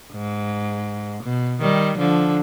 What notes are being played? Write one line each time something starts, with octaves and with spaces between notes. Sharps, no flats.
G#2
B2
D#3 G3
D3 F3